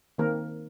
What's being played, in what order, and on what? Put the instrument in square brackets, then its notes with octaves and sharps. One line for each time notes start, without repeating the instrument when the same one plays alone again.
[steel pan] D#3 A#3 C4 A#4